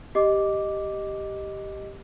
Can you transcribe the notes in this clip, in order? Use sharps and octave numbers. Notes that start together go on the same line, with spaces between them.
G4 D#5 D6